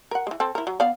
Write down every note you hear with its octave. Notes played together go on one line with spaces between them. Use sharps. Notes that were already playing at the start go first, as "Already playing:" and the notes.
A#4 F#5
E3 G#3
C4 A4
E4 A#4
F#3
B3 D5 F5